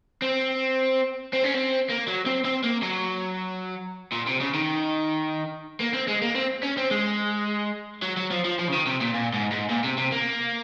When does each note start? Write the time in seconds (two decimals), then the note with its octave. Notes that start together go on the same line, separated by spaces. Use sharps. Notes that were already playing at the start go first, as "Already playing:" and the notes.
0.22 C4
1.33 C4
1.44 C#4
1.54 C4
1.89 A#3
2.07 F#3
2.26 C4
2.45 C4
2.63 A#3
2.82 F#3
4.12 A#2
4.27 C3
4.40 C#3
4.54 D#3
5.80 A#3
5.93 C4
6.08 G#3
6.22 A#3
6.35 C4
6.63 C#4
6.77 C4
6.91 G#3
8.02 F#3
8.17 F#3
8.31 F3
8.44 F3
8.59 F3
8.68 C#3
8.72 D#3
8.86 C3
9.01 A#2
9.14 A#2
9.33 G#2
9.52 G#2
9.70 A#2
9.84 C3
9.98 C3
10.12 A#3